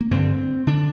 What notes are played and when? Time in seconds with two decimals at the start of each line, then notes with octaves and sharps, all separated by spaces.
0.01 A#3
0.11 G2 D3 C4
0.67 D3 D4